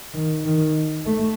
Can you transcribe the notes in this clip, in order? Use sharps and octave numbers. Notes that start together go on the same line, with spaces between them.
D#3
D#3
A3